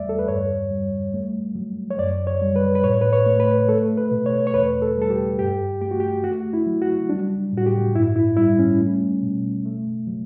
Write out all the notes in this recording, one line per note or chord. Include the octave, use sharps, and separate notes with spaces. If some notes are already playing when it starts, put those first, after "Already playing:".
Already playing: E2 G3 A3 D5 E5
A4
B4
G2 C#5
G3
A3
F#3
C#5
F#2 D5
C#5
G3
B4
B4
A2 C#5
B4
C#5
A3
B4
A3 A4
B4
B2
C#5
C#5
E2 B4
A4
G3 A4
G4
G2 G4
A3 G4
F#4
G4
A3 F#4
E4
F#3
F#4
G3 D4
A2 F#4
G4
G2 E4
E4
G3 E4
C#4
A3
B2
A3
F#3